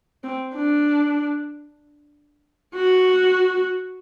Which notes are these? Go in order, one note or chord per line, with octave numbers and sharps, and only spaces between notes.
C4
D4
F#4